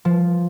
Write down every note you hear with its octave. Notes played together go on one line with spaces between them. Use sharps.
F3